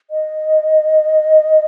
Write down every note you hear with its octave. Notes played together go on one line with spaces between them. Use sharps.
D#5